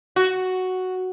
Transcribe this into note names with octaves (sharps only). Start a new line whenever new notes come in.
F#4